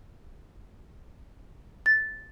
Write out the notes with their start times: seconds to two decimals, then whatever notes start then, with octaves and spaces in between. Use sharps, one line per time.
1.86 A6